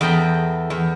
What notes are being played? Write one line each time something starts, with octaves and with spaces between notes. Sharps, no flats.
E2 G#4 A4 G5 A#5 B5
E2